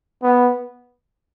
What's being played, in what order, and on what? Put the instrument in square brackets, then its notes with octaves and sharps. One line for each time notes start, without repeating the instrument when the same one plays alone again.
[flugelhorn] B3